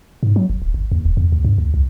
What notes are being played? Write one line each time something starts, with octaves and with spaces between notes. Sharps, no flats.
G#2
F#3
F#1
D1
G1
D#2
D#1
E2
D2
G2
D2
C2